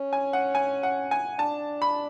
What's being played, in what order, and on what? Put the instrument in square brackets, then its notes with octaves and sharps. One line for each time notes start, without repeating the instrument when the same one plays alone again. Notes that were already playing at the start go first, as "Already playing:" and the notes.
Already playing: [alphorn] C#4
[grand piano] G#5
F#5
G#5
F#5
G#5
[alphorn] D4 [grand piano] A5
[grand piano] B5